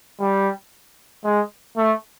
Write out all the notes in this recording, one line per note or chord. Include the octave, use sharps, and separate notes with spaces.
G3
G#3
A3